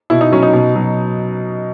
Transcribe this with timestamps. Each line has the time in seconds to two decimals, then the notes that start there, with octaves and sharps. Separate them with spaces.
0.10 B2 E4
0.21 D#4
0.32 F#3 C#4
0.43 D#4
0.54 B2
0.75 F#3